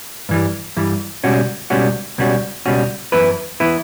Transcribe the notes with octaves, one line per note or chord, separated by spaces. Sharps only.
G2 E3 G3
G2 E3 G3
C#2 B2 G3 C#4 F#4
C#2 B2 G3 C#4 F#4
C#2 B2 G3 C#4 F#4
C#2 B2 G3 C#4 F#4
F#2 E3 B3 E4 B4
E3 B3 E4 B4